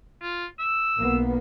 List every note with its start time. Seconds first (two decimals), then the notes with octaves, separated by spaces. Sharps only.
0.22 F4
0.60 E6
0.97 B1 A#3 B3